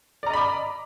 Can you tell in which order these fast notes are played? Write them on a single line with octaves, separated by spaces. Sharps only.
D5 A#5 D#5 B5 D6